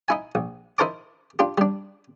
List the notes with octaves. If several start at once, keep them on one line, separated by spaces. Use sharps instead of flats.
D#4 E4 G#5
A#1
D#4 E4 A#4 C5 A5 D6
D4 F4 G4
G3 D4